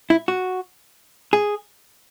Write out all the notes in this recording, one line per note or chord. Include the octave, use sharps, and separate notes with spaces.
E4
F#4
G#4